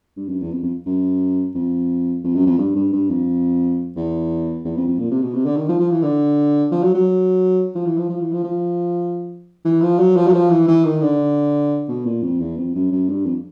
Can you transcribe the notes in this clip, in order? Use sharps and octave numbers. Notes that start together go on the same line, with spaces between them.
G2
F#2
E2
F2
F2
F#2
F2
F2
F#2
F2
G2
G2
G2
F2
E2
E2
F2
F2
A#2
C3
B2
C3
D3
D#3
F3
F3
E3
D3
F3
F#3
F#3
F3
E3
F3
F3
E3
F3
F3
E3
F3
F#3
F3
F#3
F3
E3
E3
D#3
D3
B2
A#2
F2
E2
F2
F#2
F#2
G2
F2